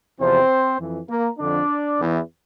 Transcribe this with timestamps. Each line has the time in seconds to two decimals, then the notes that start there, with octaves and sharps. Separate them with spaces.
0.19 E2 C3 F3 C4 C5
0.79 F2 E3
1.08 A#3 A#4
1.38 F2 D3 F3 D4 D5
1.99 E2 E3